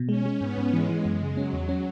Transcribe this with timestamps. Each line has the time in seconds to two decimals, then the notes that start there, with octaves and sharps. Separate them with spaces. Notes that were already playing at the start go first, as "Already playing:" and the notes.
Already playing: B2
0.09 G#3 C#4
0.26 G#3
0.41 G#2 B3
0.58 G#2
0.73 E3 G#3
0.89 E3
1.05 F#2 G#3
1.21 C#3
1.37 F#3 C#4
1.53 E2
1.69 C#4